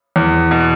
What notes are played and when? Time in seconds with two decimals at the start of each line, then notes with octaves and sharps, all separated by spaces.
0.16 E2
0.51 B2